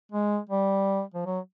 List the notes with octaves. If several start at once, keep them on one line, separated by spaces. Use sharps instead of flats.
G#3
G3
F3
F#3